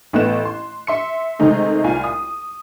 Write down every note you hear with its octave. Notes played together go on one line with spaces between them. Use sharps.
A1 A3 B3 F#6 E7
C6
E5 C6 C#7
C3 D#3 G#3 A3 D#4 G#4
C2 F4 G#5
D#6